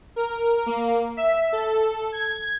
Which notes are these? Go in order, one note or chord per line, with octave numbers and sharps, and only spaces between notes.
A#4
A#3
E5
A4
G#6